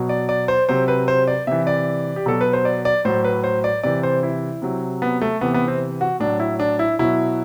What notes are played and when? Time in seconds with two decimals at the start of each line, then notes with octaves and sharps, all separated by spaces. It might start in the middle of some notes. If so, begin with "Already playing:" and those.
Already playing: B2 F#3
0.09 D5
0.29 D5
0.48 C5
0.69 C3 F#3 C5
0.88 B4
1.08 C5
1.28 D5
1.47 C3 E3 E5
1.67 D5
2.16 G4
2.26 B2 F#3 A4
2.41 B4
2.53 C5
2.65 D5
2.85 D5
3.05 A2 F#3 C5
3.24 B4
3.44 C5
3.64 D5
3.83 C3 E3 D5
4.03 C5
4.23 E4
4.62 C3 F#3
5.02 B3
5.21 A3
5.41 C3 E3 B3
5.54 B3
5.68 C4
6.01 F#4
6.20 A2 F#3 D4
6.40 E4
6.60 D4
6.79 E4
6.99 B2 F#3 E4